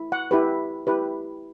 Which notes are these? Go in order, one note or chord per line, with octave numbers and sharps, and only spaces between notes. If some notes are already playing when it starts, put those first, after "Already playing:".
Already playing: E4
F#5
E4 G4 B4
E4 G4 B4